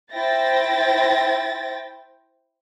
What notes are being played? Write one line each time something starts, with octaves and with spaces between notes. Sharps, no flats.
E4 C5 G5 A6 A#6